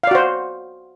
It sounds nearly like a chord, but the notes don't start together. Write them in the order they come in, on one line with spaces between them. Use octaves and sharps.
F5 D5 F#4 C5